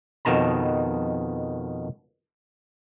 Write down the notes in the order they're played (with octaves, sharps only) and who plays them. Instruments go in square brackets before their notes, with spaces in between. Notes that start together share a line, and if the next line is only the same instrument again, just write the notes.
[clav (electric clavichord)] F2 B2 D#3 A5 A#5